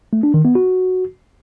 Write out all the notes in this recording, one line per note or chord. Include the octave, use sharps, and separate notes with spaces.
A3
D4
D#3
B3
F#4